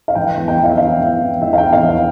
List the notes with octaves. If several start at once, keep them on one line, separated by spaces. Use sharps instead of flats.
F5
E3 G5
E2
G5
E2
F5
E5
E3 F5
E3
E2
E3 E5
F5
G5
E2
F5
E3
F5